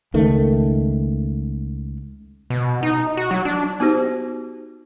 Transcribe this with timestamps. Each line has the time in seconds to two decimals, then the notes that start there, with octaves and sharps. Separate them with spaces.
0.14 C#2 D#3 A3
2.50 B2
2.83 D#4
3.17 F#4
3.31 F#3
3.45 D4
3.80 B3 D#4 F#4 G4 C5